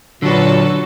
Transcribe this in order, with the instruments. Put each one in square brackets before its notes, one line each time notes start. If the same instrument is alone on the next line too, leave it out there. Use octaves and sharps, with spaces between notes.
[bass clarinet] A#2 [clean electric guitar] D3 [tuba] F#3 [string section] F#4 A4 B4